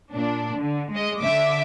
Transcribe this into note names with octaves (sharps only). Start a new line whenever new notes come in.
A#2 D4
D3
G#3 D#5
D3 E5 D6